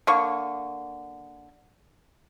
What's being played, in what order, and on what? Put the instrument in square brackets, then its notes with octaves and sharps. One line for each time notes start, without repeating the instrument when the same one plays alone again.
[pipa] D3 A#3 C#6